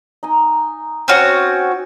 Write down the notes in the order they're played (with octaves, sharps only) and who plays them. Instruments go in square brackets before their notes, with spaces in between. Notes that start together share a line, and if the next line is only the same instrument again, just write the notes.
[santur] D#4 G#5
[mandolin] C4 C#4 F#4